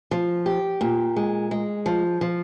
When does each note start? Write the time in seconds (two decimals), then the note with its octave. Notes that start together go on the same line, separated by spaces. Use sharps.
0.11 F3
0.46 G4
0.81 A#2
1.16 G#3
1.51 G#3
1.86 F3
2.21 F3